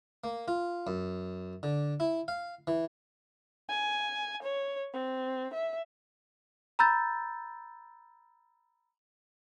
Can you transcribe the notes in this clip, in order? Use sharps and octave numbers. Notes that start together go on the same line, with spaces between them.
A#3
F4
F#2
D3
E4
F5
E3
G#5
C#5
C4
E5
A#5 B5 E6 G6 A6